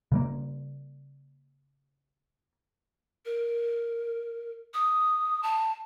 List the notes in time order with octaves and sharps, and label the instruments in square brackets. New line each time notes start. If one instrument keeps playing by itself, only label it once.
[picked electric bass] C#3 G3 A#3
[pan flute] A#4
D#6
A5